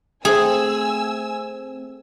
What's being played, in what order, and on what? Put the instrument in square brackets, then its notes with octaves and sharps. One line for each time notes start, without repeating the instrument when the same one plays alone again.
[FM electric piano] A3 C4 [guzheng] G#4 [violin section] G#5 E6